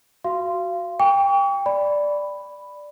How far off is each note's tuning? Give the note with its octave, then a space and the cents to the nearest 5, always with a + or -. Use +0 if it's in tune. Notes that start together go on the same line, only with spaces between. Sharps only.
F#4 +0 F5 -25 C6 +0
G5 +25 C#6 +45
D5 +0 B5 +0